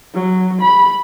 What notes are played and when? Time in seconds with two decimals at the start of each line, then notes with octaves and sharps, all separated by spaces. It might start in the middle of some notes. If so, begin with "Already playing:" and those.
0.14 F#3
0.62 B5